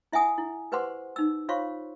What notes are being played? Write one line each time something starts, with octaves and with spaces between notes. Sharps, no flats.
E4 E5 F#5 G#5 D#6
E4
G4 B4 C5 F#5 C6 D6
D#4 E6
F4 C5 C#5 F5 C6 C#6